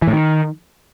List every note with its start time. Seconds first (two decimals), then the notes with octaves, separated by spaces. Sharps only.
0.02 E3
0.07 A2
0.13 D#3